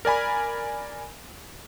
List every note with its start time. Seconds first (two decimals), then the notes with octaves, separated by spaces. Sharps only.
0.05 A#4 D5 G#5 B5